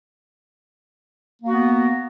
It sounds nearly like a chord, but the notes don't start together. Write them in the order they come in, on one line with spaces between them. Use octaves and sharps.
A#3 F#4 B3